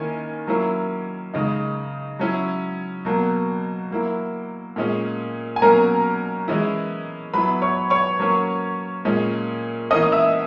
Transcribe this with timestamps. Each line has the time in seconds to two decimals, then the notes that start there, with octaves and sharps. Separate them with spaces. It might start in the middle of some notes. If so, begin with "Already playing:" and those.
Already playing: D#3 A#3 C#4 E4 G#5
0.47 F#3 A#3 C#4 E4
1.34 C#3 G#3 D#4
2.19 F#3 C#4 E4
3.05 B2 F#3 A#3
3.91 F#3 A#3 E4
4.76 A#2 G#3 C#4
5.56 G#5
5.62 B2 F#3 A#3 C#4 A#4 A#5
6.48 E3 G#3 C#4 E4
7.34 F#3 B3 E4 B4 B5
7.62 C#5 C#6
7.90 C#5 C#6
8.19 F#3 A#3 C#4
9.05 A#2 G#3 C#4
9.91 E3 A#3 C#4 D#5 D#6
10.02 D#6
10.12 E5 E6